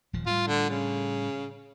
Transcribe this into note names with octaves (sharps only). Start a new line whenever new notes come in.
D#1 F3
A2 G3 F4
D3
C#3